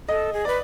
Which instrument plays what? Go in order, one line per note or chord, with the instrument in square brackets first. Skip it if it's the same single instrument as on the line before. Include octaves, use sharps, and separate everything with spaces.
[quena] A4 [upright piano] D#5
[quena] G#4
[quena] B4 [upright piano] D5